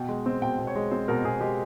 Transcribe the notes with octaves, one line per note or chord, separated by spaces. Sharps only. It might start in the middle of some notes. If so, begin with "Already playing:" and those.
Already playing: B2 G5
G#3
C4
B2 G5
B2
C#5
G#3
C4 C5
B2 A#4
B2 G#4
G#3 G4